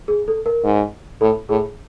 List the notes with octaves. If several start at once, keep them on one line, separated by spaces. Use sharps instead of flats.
G#4
A4
A#4
G#2
A2 A4
A2 G#4